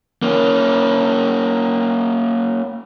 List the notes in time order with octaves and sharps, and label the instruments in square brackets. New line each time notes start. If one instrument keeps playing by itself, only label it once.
[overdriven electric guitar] A#3 C#4